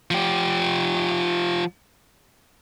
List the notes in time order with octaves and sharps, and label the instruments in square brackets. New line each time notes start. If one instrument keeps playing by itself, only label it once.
[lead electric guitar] F3 G4